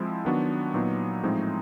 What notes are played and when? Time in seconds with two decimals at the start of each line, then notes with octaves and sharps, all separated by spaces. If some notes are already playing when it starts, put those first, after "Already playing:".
Already playing: F3 G#3 C4 E4
0.25 D#3 F#3 B3 D4 F#4
0.74 A#2 F#3 B3 D#4
1.23 A2 F3 G#3 C4 D#4